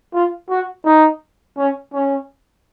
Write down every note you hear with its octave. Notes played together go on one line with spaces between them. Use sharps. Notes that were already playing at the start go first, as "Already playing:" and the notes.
F4
F#4
D#4
C#4
C#4